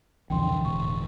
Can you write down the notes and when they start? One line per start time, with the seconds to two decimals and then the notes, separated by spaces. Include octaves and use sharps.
0.30 C2 F2 B2 D3 E3 F3 G5 C6
0.65 E1 A2 C#6